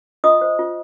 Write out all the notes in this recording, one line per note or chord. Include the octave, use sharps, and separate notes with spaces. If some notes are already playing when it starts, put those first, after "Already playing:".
F4 D#5 D#6
C5
F4